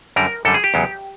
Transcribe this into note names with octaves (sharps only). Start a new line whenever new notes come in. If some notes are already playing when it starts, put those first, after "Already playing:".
F#2 D3 G3 A#4
F#2 D3 G3 A4
G#4
G4
E2 C#3 F#3